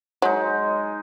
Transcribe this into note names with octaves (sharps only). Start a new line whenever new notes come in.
F#3 G#3 D#4